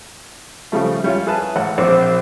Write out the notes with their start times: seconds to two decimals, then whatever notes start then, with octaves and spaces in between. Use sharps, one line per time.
0.72 C#3 F3 G3 A3
1.04 G3 C#4 E4 F4
1.26 E4 G#4 B4 A5
1.56 A1 F#5
1.78 A#1 C4 C5 D6